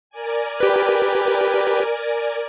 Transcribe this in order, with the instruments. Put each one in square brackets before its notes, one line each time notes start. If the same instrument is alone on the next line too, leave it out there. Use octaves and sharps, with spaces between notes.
[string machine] A#4 D5 G#5
[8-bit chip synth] G4 B4